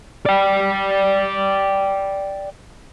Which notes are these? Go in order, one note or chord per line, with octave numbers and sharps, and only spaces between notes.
D5 G5